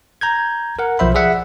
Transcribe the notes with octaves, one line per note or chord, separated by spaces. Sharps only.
A#5 G6 G#6
A#4 F#5
B1 F3 C5 E5 B5
G#4 D5 E5 F#5